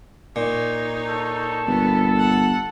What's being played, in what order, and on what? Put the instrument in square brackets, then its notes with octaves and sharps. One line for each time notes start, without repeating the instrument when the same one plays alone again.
[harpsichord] A#2 [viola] D#4 C#5
[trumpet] A4
[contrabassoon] G1 [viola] B3
[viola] F#5